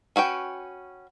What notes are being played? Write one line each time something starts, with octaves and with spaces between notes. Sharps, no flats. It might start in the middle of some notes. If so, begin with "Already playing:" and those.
C#4 F#4 B4 G5